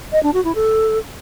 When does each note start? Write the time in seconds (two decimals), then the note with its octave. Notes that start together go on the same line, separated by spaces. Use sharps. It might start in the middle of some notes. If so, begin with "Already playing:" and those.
0.12 D#5
0.23 D4
0.34 F#4
0.44 E4
0.55 A4